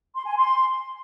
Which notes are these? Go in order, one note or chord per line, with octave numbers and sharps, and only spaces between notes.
C6
G#5
C6